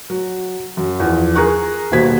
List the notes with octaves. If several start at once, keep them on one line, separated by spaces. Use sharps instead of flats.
F#3
F#2
E2 F3
G#4 A#4 A#5 C#6 F#6
D#1 B2 C5 G#6 B6